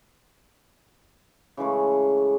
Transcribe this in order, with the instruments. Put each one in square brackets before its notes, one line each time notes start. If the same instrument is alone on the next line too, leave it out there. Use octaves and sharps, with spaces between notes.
[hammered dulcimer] C#3 E3 G#3 A3